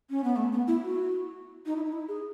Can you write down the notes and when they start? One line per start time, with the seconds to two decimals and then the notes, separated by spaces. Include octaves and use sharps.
0.10 C#4
0.24 B3
0.36 A3
0.52 B3
0.68 E4
0.83 F#4
1.66 D#4
1.76 E4
1.85 D#4
1.93 E4
2.08 G#4